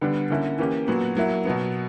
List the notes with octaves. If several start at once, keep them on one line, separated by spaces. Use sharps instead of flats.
D3 G3 B3 D4
D3 A#3 C#4 E4
E3 A#3 C#4 G4
A#2 F#3 B3 F#4
F#3 A#3 E4
B2 F#3 B3